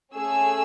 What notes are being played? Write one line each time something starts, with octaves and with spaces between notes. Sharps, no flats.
A3 C#4 G#4 E6